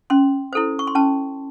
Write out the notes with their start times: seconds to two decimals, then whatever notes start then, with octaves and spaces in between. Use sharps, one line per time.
0.10 C#4 C6
0.53 E4 A4 C5
0.79 C#6
0.87 C6
0.95 C#4 A5